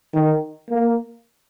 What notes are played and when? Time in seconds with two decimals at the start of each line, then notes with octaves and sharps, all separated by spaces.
0.14 D#3
0.70 A#3